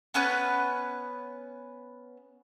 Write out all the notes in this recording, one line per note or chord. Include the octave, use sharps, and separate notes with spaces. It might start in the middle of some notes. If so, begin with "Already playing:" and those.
B3 C#4 B4 F#6